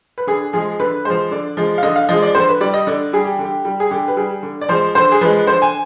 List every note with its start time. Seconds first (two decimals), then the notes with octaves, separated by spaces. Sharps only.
0.18 B4
0.27 D3 G#4
0.53 F3 G#3 G#4
0.79 D3 B4
1.05 F3 G#3 C5
1.31 D3 D5
1.57 F3 G#3
1.78 F5
1.83 D3 D#5
1.96 F5
2.09 F3 G#3 D#5
2.22 D5
2.35 D3 C5
2.49 B4
2.61 G3 D5
2.74 D#5
2.87 D3 D5
3.13 G3 G#4
3.24 G4
3.39 D3
3.44 G4
3.65 G3
3.80 G#4
3.91 D3 G4
4.08 B4
4.17 G3 G#4
4.43 D3
4.61 D5
4.69 F3 G#3 C5
4.95 D3 C5
5.12 G#4
5.21 F3 G#3 B4
5.47 D3 C5
5.62 G#5